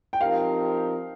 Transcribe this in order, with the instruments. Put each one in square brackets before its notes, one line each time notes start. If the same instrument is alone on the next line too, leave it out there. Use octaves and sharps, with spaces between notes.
[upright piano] G5
[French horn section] F3 C4 D#4 G4 A#4 [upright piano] F5